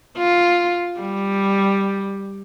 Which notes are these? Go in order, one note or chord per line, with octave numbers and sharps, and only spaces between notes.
F4
G3